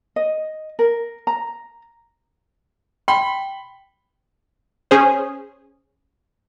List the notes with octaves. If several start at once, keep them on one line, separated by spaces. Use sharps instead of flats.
D#5
A#4
A#5
G5 B5 C6
C#4 G#4 C5